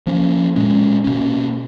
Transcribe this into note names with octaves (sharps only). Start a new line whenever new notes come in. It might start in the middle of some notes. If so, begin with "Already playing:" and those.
F3 A#3 C#4
A#2 G#3 C#4
B2 A#3 C#4